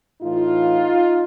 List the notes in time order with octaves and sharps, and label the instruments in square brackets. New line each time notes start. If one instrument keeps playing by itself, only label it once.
[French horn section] A2 E3 D#4 F4